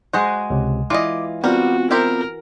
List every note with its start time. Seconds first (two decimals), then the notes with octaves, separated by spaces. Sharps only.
0.13 G#3 F#4 G#4 C5 D#5 F#5
0.50 C#2 C3
0.90 E3 F4 D5 D#5 D6
1.44 G3 B3 C4 F4 F#4 A#4
1.91 E4 G4 A#4 C5